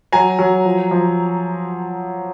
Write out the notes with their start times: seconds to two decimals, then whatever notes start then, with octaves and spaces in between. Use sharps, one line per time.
0.12 F#3 G#5 A#5
0.39 F#3
0.65 F3
0.91 F3